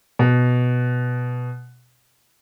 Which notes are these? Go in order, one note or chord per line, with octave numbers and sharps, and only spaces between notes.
B2